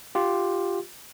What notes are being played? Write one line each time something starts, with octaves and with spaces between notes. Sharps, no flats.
F4 G4